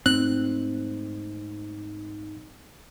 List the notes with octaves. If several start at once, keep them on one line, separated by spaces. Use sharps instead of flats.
G#2 A3 C4 D#4 F#6